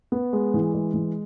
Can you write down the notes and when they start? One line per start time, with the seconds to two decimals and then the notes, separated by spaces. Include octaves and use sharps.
0.12 B3
0.33 G#3
0.54 E3
0.74 G#3
0.94 E3